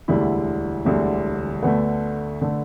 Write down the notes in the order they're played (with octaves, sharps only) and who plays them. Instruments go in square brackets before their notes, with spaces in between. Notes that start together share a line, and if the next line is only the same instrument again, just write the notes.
[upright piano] E1 D2 D3 G3 E4
E1 D2 D3 G3
D2 D3 A3 B3
D3 A3